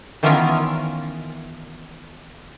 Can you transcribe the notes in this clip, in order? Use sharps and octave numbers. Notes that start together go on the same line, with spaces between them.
D#3 E3 B3 C#4 F4 A#4